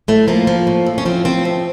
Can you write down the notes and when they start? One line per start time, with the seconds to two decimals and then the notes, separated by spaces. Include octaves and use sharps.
0.08 A2 A3
0.28 F3 A#3
0.47 F3
0.67 A2
0.86 A2
0.98 C#4
1.06 F3 C4
1.25 F3 C4
1.45 A2